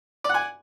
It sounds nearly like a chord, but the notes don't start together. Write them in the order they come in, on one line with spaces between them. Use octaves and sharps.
D5 F#5 G#5